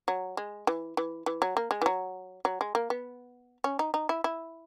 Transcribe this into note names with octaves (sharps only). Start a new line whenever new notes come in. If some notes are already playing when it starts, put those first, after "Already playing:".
F#3
G#3
E3
E3
E3
F#3
A#3
G#3
E3
F#3
F#3
G#3
A#3
B3
C#4
D#4
D#4
E4
E4